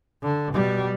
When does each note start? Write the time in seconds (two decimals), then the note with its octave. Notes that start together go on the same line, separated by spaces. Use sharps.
0.23 D3
0.54 B2 G3